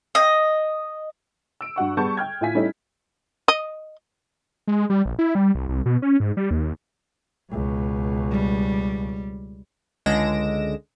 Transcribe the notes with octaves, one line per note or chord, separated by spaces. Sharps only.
D#5
E6 D7
G2 F#4 F#5 C#6
G3 B3 G#4 A5 C#6 G6
G5 F6 G#6
A2 E4 F4 G#5 B6
G3 A3 C#4 D#4 E4
D#5
G#3
G3
A#1
E4
G3
C2
C2
B2
C#4
G#2
G3
D#2
C#2 B2
G3
C#2 D3 G#3 A#6 D7 E7